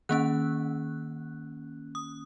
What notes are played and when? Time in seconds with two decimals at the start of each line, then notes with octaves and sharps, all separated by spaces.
0.09 D#3 A#3 C#4 F#6
1.95 D#6